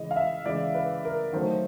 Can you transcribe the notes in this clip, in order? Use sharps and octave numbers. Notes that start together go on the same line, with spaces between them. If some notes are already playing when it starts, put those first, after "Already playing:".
Already playing: C#3 E3 G#3 D#5
F5
E5
C#3 E3 G#3 D5
B4
A#4
D#3 F#3 A3 C5